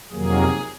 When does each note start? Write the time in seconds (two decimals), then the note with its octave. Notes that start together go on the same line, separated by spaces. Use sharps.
0.12 F2 C3 D#3 F#3 A#3 G#4